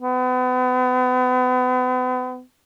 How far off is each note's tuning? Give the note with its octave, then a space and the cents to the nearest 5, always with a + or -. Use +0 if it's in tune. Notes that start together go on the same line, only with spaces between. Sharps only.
B3 +40